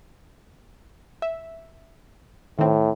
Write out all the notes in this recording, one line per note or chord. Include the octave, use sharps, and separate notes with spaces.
E5
A2 D#3 C4